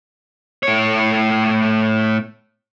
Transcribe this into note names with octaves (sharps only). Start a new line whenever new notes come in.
A2 C#5